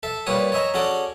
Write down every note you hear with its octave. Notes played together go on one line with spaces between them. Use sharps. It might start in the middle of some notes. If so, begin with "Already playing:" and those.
A4 E5
A#2 G3 B4 C#5 D#6
C#5 D#5 E5 G#5 A#5
C#4 F#4 G#4 A4 D5